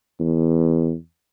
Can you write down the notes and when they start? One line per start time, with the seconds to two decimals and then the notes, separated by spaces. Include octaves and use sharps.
0.20 E2